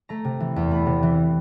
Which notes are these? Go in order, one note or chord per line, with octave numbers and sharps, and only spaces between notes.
A3 A#5
C3
E3
E2
A3 B5
C3
E3